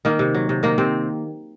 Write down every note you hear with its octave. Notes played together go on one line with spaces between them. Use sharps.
D#3 A#3
C3
F#3
C3
D#3 A#3
C3 C4